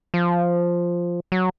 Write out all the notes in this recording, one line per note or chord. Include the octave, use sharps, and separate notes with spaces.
F3
F#3